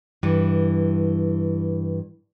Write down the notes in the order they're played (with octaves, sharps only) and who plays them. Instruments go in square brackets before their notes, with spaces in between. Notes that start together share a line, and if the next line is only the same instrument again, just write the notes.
[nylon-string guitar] G2 E3